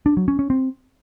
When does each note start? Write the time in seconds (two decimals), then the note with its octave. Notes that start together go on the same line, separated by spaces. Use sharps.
0.06 D4
0.17 F#3
0.28 C#4
0.39 C#4
0.50 C4